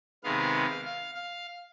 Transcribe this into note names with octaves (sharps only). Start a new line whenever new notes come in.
C3 D#3 G#3 B3 F5
F5
F5